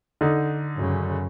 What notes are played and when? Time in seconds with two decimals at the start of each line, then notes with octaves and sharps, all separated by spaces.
0.21 D3 D#4
0.76 F#2 C#3